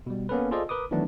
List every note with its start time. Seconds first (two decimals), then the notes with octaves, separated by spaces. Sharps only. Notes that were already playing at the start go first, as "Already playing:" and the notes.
0.06 B2 G3
0.29 A#3 B3 C#4 A4 B4
0.51 F4 G#4 A4 C5 D5 D#5
0.69 A#4 B4 D6 D#6
0.91 D#3 E3 F#3 A3 B3 D4